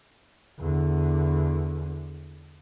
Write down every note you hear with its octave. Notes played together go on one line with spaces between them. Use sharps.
E2 D3